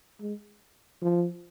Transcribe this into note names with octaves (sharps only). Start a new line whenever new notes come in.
G#3
F3